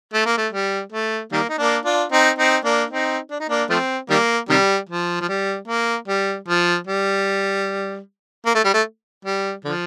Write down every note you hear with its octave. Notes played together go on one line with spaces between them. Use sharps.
A3
A#3
A3
G3
A3
D#3 G3 A#3
D#4
A#3 D4
D4 F4
C4 D#4
C4 D#4
A#3 D4
C4 D#4
D4
D#4
A#3 D4
F3 A3 C4
D#3 G3 A#3
C3 D#3 G3
F3
F3
G3
A#3
G3
F3
G3
A#3
A3
G3
A3
G3
D3 F3